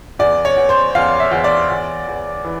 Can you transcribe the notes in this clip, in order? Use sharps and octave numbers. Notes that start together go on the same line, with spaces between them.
E2 D5
C#5
E2
C5
E2 F5
E5
E2
D5
E2
E2
E3